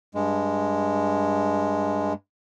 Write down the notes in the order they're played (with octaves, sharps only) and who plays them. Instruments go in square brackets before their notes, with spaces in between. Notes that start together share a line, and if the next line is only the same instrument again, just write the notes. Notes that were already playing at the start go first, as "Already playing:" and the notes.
[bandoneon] G2 G#3